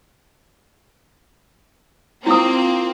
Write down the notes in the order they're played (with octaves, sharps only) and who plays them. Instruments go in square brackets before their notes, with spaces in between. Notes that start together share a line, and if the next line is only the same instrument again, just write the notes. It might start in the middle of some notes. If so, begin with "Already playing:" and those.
[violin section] A#3 C4 [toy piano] E4 D#6 [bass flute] F4